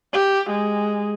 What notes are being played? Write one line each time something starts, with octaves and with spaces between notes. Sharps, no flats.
G4
G#3